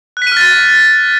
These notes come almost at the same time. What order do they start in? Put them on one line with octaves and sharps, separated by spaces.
F#6 B6 D#7 F6 A6